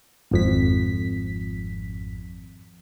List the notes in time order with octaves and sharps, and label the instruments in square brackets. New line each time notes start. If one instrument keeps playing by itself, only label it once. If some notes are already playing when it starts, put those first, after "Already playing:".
[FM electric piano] G#1 F2 B6